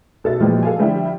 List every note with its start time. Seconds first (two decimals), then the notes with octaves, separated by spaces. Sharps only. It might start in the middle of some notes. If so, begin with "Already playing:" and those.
0.24 B1 A4 E5 A6
0.40 A#2 E3 F3 G3 G#3
0.63 A4 F5 G#5
0.79 D3 F3 G3 E4